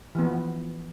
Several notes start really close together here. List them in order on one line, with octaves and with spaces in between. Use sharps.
E3 B3 F3